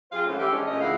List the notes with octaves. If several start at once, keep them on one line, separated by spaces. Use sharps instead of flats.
F3 C4 F4 G#4 C5 F5
G#2 E3 A3 C4 C#4
E3 G3 G4 A4 C5 E5
G#3 C#4 D4
A#2 G#3 A3 C#4 D#5
D2 F3 E4 G#4 F5 F#5